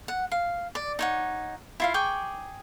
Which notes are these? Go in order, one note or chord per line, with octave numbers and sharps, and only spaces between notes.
F#5
F5
D5
D#4 C#5 F#5
E4 F4 F5
G#4 G5 C#6 D6